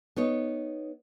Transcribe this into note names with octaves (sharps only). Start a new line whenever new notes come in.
B3 D#4 C#5